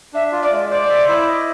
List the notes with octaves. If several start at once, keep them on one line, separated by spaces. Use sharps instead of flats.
D4 E5
F4
D5
G#3
C5 D5
E5
E4
D#5